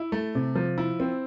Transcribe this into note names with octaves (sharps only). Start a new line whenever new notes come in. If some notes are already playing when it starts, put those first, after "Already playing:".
Already playing: E4
A3
C3
F3
E4
C4